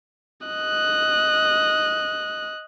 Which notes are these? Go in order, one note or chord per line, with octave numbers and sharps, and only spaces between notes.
D#5 F#6